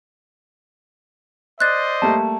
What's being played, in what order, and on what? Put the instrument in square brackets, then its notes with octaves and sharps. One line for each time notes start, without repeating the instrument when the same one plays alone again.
[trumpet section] C5 D5 D#5 [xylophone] F#6 A6
[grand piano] G3 A3 A#3 [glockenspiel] A5